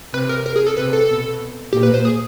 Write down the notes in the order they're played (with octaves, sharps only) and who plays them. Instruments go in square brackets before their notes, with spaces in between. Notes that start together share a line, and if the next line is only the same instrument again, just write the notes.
[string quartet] C3 [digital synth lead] B4
[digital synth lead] A#4
A#4
G#4
A4
[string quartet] C3 [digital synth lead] B4
[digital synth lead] A4
[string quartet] B2
[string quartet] A#2 [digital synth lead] G4
[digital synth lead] B4
C5
G#4